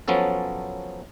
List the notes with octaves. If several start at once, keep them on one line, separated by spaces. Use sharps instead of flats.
F3 F#3 B3 C#4 A4